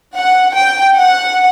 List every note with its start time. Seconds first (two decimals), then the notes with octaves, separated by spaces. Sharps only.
0.17 F#5
0.55 G5
0.96 F#5